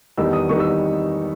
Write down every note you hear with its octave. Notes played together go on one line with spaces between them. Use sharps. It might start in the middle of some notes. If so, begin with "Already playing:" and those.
E2 D#3 G3 B3 D#4 E6
D#6
E2 D#3 G3 B3 D#4 C#6
E6